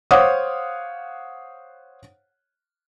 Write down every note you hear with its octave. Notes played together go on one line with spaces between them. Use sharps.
C5 C#5 F5 F#5 D6 D#6